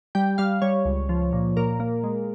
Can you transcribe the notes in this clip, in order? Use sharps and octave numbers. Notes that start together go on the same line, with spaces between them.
G3 G5
G3 F5
G3 C#5
C#2
F3
A#2
A#2 A#4
A#3
G#3